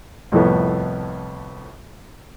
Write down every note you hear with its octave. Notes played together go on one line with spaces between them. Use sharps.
C2 F2 A2 B3